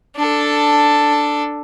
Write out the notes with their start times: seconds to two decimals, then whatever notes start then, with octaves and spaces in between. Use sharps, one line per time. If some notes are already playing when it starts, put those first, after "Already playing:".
0.17 D4 A4